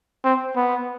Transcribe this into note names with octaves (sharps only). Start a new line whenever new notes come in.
C4
B3